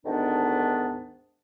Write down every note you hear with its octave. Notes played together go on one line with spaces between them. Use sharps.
D2 G#2 D#3 B3 D4